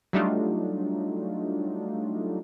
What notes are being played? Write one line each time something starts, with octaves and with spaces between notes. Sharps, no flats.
F#3 G3 A3 D4 D#4 F4